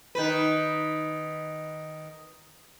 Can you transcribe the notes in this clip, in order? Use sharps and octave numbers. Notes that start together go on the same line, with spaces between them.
D#3 B4